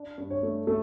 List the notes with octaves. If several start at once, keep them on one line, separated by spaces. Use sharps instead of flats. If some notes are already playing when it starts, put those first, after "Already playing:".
Already playing: D4
G2
C#5
A3
A3 A4